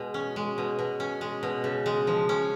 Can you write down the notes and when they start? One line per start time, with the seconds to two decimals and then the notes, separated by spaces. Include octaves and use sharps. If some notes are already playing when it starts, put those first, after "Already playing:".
Already playing: B2 G#3
0.14 C#4
0.36 G#3
0.58 B2
0.79 B2
1.00 C#4
1.21 G#3
1.43 B2
1.64 C#3
1.86 G#3
2.07 F3
2.29 C#4